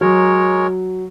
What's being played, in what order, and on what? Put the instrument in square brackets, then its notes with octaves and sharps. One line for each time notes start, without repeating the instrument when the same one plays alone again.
[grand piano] F#3 [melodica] G#3 A#4 C#5